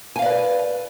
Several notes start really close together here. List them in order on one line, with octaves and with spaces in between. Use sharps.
G#5 F5 D5 B4